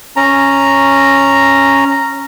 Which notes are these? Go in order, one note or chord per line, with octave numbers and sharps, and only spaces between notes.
C#4 A#5